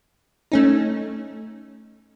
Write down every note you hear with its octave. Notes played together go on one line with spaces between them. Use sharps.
A3 C#4 D#4